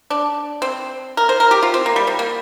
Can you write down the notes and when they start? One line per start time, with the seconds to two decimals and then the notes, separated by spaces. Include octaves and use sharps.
0.10 D4
0.62 C4
1.17 A#4
1.29 C5
1.40 A#4
1.51 G4
1.63 F4
1.74 C4
1.86 A#3
1.96 G3
2.07 G3
2.19 A#3